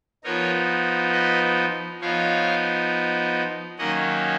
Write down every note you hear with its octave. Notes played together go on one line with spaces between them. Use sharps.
F3 B3 D#4 A#4 C#5
B4 D#5
F3 B3 D#4 C#5 F5
D#3 F#3 A#3 C#4 D#5 F#5